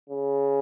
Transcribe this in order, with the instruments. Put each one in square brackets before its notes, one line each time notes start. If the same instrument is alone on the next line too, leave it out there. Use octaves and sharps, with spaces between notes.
[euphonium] C#3